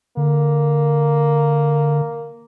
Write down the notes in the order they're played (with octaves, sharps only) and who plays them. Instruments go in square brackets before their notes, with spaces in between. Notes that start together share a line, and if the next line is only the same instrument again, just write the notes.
[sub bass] D3 [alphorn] A#3